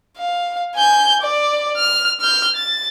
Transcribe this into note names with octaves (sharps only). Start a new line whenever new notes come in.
F5
G#5 G6
D5
F6
F6 G6
A6